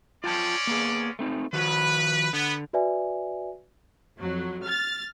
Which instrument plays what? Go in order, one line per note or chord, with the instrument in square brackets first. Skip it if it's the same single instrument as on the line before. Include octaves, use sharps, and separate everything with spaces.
[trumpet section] G#3 C#4 D5 [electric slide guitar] F4 G5 A5
[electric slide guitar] A#3 B3 G#4
A3 C4 D#4
[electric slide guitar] D#3 F3 F#4 [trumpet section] B4
[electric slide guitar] D3 [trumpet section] B3
[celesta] F#4 B4 D5 E5 G#5
[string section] F2 F#3
F6 A6